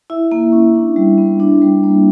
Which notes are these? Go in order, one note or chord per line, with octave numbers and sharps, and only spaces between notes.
E4 E5
A#3
C#4
D4
G3
B3
D4
G3
A#3